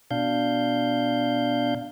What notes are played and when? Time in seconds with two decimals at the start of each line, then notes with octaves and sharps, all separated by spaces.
0.11 B2 D4 F5 G6